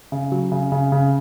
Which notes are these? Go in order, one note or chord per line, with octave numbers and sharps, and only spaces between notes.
C#3
F#3
C#3
C#3
C#3